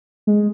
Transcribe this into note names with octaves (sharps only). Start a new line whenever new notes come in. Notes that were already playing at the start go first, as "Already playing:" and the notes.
G#3